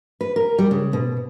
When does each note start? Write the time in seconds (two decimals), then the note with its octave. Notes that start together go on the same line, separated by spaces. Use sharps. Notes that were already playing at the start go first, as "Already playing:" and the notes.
0.21 B4
0.36 A#4
0.58 G3
0.71 C#3
0.93 B2